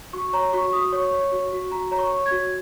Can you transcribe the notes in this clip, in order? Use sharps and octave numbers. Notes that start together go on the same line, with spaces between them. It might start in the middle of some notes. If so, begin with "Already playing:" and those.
F#4 C#6
C#5 A#5
F#4 C#6
F#4 D#6
C#5 C#6
C#5
F#4
F#4
F#4 A#5
C#5 A#5
C#6
C#5
G#6
F#4